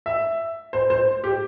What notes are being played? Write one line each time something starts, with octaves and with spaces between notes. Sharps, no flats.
E5
C5
C5
G4